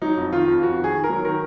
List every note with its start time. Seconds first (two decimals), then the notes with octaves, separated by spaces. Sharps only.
0.02 F#3 D#4
0.17 F2
0.32 D#3 F4
0.48 F2
0.63 F2 F#4
0.79 D#3 G#4
0.94 D#3
1.04 A#4
1.09 F#3
1.24 D#3 A#4